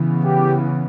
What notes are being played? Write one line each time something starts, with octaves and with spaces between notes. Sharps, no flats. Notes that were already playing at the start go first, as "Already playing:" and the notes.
Already playing: C#3 E3 B3
G4